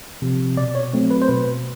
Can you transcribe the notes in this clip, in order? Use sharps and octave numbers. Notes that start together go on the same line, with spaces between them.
C3 F3
B2 D5
C#5
F#3 A3 C4
B4
C5
B2 B4